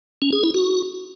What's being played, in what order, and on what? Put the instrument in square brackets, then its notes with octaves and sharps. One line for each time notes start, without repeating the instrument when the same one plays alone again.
[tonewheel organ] C#4
G#4
E4
F#4